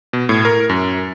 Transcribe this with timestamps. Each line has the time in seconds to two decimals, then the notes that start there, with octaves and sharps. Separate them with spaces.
0.13 B2
0.29 A2
0.45 A#4
0.69 F#2